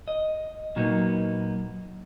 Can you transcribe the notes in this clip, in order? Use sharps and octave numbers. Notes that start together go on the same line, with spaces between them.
D#5
A#2 F#3 A#3 B3 D#4